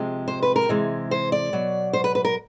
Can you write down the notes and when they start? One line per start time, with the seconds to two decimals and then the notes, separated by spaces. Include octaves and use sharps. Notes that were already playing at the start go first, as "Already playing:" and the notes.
Already playing: C3 F3 G#3
0.28 C5
0.43 B4
0.56 A#4
0.69 C3 E3 G#3
1.11 C5
1.32 D5
1.53 B2 F#3
1.93 C5
2.04 B4
2.15 B4
2.25 A#4